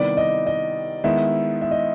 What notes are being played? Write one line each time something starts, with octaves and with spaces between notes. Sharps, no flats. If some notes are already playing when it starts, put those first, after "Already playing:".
Already playing: C3 D#3 G3 B3 E4 D5
D#5
D#5
D#3 G#3 B3 E4 E5
E5
D#5